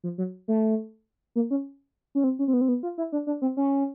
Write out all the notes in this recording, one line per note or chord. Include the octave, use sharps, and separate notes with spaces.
F3
F#3
A3
A#3
C#4
C#4
C4
C#4
C4
B3
C4
B3
F4
E4
D4
D4
C4
C#4